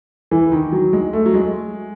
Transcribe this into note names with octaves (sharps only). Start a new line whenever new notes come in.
E3
D#3
F#3
G#3
A3
F#3
G#3